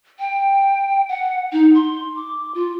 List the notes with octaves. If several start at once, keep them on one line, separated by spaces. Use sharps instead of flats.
G5
F#5
D#4
C6
D6
F4